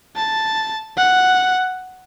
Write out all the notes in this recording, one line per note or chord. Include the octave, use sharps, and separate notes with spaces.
A5
F#5